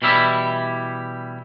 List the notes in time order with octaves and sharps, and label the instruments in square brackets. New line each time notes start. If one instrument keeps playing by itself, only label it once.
[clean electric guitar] B2 E3 G3 E4 E5